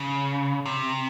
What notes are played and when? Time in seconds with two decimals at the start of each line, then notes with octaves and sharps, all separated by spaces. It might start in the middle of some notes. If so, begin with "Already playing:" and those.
Already playing: C#3
0.66 C3